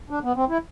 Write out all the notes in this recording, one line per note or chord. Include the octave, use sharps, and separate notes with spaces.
D4
B3
C4
E4